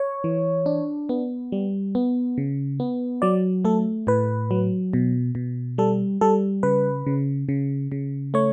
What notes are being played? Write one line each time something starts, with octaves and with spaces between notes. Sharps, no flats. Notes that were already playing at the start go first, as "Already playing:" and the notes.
Already playing: C#5
E3
D4
B3
G3
B3
C#3
B3
F#3 D5
A3 A4
A2 B4
F#3
B2
B2
G3 A4
G3 A4
C#3 B4
C#3
C#3
C#3
A3 C#5